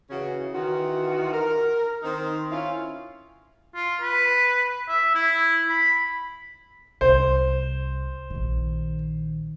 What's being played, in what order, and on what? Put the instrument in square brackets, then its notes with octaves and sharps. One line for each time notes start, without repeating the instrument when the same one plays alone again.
[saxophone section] C#3 E3 C#4 F#4
D#3 E3 F4 F#4
A#4
D#3 C4 D#4 C5
C#4 E4 F4 C#5 F5
[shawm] F4
B4
E5
E4
B5
[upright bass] C2 [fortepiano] C5
[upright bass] A#1 D#3